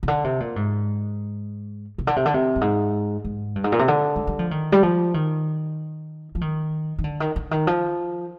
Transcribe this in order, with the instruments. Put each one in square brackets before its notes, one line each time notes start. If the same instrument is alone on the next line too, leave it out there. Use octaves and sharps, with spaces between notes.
[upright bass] C3
D3
C3
A#2
G#2
C3
D3
C3
D3
C3
G2
G#2
G#2
G2
G#2
A#2
C3
D3
G#3
G3
F3
D#3
G3
F3
D#3
F3
D#3
D#3
D3
D#3
D3
D#3
F3